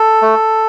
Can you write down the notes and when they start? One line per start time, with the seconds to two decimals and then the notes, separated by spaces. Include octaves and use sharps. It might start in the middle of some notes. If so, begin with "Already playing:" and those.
Already playing: A4
0.22 A3